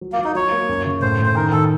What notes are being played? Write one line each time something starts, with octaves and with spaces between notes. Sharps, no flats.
F#3
A#3
F#3
D#4
F#3 C#5
A#3
F#2
C#3
A2 C5
A2
C5
D#3 A#4
D#3 A4